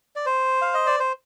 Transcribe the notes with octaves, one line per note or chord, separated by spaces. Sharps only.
D5
C5
F5
D#5
D5
C5